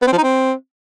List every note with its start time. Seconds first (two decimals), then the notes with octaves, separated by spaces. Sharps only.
0.02 B3
0.07 C4
0.13 F3
0.18 D#4
0.23 C4